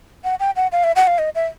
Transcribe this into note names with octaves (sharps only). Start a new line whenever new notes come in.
F#5
G5
F#5
F5
E5
F#5
F5
D#5
E5